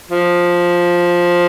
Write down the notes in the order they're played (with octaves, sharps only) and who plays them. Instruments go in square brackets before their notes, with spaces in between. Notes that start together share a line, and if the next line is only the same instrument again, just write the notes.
[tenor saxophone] F3